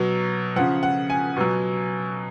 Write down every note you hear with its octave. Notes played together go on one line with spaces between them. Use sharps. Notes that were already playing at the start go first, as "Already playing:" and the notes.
Already playing: B2 F#3
C#3 F3 F#5
F#5
G#5
B2 F#3